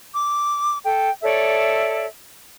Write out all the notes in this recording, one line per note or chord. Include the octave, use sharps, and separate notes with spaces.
D6
A4 G5
A4 C#5 D5 E5